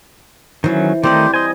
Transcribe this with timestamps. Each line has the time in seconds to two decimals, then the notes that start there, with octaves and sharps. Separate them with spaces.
0.64 D#3 E3 F#3 C#4 C5
1.03 D#3 G3 A3 C4 D#4 G4 C5 D5
1.34 C5 D#5 G#5